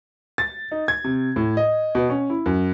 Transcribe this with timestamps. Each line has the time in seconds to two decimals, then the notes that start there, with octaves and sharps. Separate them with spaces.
0.38 A6
0.71 D#4
0.88 G#6
1.04 C3
1.36 A2
1.57 D#5
1.95 B2
2.10 C#4
2.30 E4
2.46 F#2